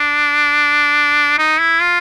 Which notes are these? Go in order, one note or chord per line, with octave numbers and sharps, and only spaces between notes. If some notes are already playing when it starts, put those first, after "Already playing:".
Already playing: D4
D#4
E4
F4